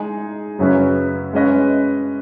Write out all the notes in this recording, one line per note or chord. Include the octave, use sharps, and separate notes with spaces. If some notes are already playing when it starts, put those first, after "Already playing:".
Already playing: G#3 D#4 G#4
F#2 C#3 F#3 C#4 B4
G#3 C#4 B4 D#5